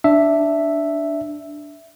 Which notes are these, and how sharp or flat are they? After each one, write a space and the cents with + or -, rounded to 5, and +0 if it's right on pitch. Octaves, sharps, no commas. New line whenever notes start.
D4 +0 E5 +0